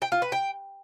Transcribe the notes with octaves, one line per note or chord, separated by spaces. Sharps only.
G5
F4
B4
G5